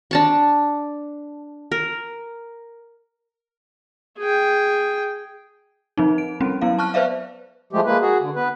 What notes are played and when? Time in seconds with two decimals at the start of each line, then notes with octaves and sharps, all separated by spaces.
0.11 D4 A5 C#6
1.72 A#4
4.19 G#4 G5
5.97 F3 C4 D#4
6.18 D7
6.40 G3 C4 C#4
6.61 F#3 B3 E4 F5
6.79 A5 C#6 F6 F#6
6.94 B4 C5 D5 E5 F5
7.73 F3 G#3 A3 G4
7.85 G#3 A#3 B4
8.01 F#4 G#4
8.21 D3
8.36 B3 B4